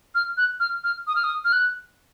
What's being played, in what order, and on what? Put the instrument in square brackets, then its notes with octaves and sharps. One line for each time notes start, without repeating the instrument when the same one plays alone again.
[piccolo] F6
F#6
F6
F6
D#6
F6
D#6
F6
F#6